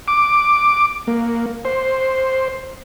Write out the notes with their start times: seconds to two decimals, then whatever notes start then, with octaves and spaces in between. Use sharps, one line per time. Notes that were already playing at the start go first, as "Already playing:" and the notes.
0.08 D6
1.07 A#3
1.65 C5